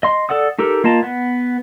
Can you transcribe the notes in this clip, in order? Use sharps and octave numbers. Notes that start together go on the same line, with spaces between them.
D#5 C6
A4 D5 F#5 D#6
D#4 G4 A4 A#4
A#3 F4 D#5 A5
B3